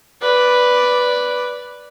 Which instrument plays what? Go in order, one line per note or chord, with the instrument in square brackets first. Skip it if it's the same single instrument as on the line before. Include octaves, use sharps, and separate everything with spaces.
[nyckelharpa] B4 D5